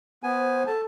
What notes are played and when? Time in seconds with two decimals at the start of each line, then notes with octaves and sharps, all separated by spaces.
0.23 B3 C5 G#5
0.67 A4 A5